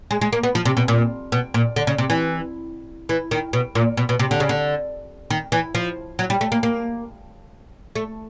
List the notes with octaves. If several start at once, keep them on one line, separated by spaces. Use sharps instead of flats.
G#3
G#3
A#3
B3
F3
C3
B2
A#2
B2
A#2
D3
C#3
C3
E3
E3
D#3
B2
A#2
B2
B2
C3
D3
C#3
D3
D#3
E3
F3
F#3
G3
A3
A#3
A#3
A3